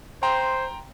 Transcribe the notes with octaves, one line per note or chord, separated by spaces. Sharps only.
C5 G5 A#5 C6